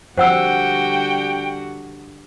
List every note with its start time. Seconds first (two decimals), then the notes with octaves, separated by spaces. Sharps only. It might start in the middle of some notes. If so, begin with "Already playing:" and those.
0.17 F2 D3 G3 F#4 C5 F#5 G5 E6